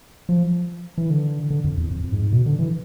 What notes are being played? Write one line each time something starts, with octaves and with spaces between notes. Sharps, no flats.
F3
E3
D3
D3
F2
E2
F2
F2
G#2
B2
D3
E3